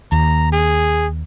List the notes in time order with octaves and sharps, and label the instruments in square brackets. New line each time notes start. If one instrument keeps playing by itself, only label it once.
[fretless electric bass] D#2 [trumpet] A#5
[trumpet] G#4